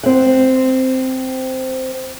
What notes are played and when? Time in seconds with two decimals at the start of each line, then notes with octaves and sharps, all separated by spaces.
0.03 C4 F#5